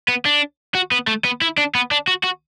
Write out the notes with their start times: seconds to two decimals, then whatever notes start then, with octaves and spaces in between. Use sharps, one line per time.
0.08 B3
0.25 D4
0.75 F#4
0.92 B3
1.07 A3
1.24 B3
1.41 E4
1.58 D4
1.75 B3
1.91 D4
2.07 F#4
2.23 F#4